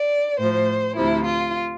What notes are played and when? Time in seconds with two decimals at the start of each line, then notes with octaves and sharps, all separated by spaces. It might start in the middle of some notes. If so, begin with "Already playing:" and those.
Already playing: D5
0.39 A2 F3 C5
0.96 D2 C3 F3 E4
1.25 F4